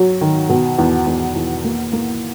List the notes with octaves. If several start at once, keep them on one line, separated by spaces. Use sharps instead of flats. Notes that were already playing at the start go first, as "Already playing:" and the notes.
Already playing: F#3
D#3
B2
E2
E2
E2
A#3
A#3